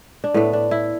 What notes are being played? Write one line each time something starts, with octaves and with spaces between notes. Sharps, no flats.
D4
A2 A3 B3
D4
E4